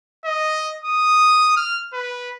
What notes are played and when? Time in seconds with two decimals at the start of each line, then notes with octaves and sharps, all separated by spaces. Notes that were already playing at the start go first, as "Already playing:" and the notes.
0.25 D#5
0.85 D#6
1.57 F6
1.93 B4